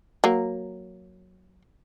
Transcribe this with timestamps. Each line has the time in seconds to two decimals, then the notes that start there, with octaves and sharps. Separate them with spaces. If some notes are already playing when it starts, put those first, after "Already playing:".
0.24 F#3 A#3